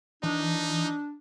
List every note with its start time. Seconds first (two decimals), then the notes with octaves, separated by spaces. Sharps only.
0.23 E3 D4 D#4